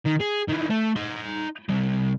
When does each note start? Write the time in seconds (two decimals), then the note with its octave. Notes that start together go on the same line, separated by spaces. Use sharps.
0.06 D#3
0.21 G#4
0.49 D#3 E3
0.70 A3
0.96 D#4 C6
1.69 C3 G3